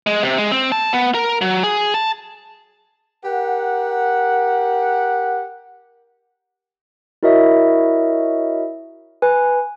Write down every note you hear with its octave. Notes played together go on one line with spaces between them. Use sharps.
G#3
C3
G#3
C4
A5
B3
A#4
F#3
G#4
A5
G4 A#4 F#5
E4 F#4 A#4 C#5 D#5 E5
B4 G#5